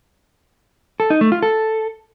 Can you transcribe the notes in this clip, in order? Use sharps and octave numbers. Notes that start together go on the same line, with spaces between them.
A4
D#4
A3
F4
A4